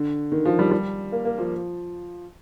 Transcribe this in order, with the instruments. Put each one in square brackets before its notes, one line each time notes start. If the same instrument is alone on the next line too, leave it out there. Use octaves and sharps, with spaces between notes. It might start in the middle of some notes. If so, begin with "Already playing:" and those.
Already playing: [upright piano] D3
D#3
F3
G3
G3
A#3
A#3
F3